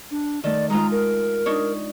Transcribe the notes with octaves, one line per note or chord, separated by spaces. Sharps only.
D4
D#3 A3 D5
G#3 D#4 F4 A#5
A#4
D4 D#4 C#5